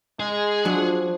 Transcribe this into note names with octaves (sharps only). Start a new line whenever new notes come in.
G#3 G#4
F3 F#3 D4